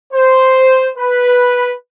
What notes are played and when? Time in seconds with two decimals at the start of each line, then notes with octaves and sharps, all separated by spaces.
0.14 C5
0.98 B4